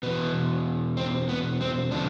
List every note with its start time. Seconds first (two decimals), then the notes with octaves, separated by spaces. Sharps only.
0.03 E2 B2 B3
0.97 C4
1.29 B3
1.61 C4
1.91 D3 F3 D4